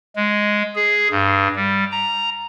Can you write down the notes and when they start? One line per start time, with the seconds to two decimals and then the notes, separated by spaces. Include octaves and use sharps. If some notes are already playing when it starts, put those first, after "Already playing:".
0.16 G#3
0.75 G#4
1.11 G2
1.56 G3
1.92 A#5